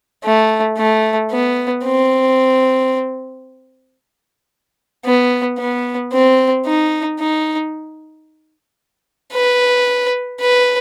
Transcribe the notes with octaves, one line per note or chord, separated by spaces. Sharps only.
A3
A3
B3
C4
B3
B3
C4
D#4
D#4
B4
B4